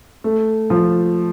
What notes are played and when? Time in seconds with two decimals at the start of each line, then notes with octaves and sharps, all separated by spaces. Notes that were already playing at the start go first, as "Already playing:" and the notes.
0.24 A3
0.70 F3